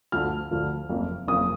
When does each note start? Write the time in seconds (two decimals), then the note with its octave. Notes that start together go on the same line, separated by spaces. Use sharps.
0.12 D2 D3 F3 F6
0.51 D2 D3 F3
0.89 F#1 F2 F3 A#3
1.27 F#1 F2 F3 A#3 D#6